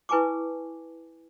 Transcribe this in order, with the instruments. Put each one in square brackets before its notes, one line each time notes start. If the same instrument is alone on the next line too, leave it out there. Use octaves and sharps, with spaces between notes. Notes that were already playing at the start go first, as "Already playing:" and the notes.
[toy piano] E4 B4 G#5 A5 C#6 D6